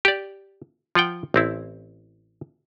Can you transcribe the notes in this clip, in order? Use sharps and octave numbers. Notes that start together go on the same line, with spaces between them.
G4 D5
F3 F4 F#5 G5
A1 C4 E4